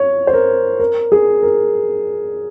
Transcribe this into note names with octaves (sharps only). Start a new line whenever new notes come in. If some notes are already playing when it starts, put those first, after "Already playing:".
Already playing: C#5
C5
A#4
A#4
G#4
A#4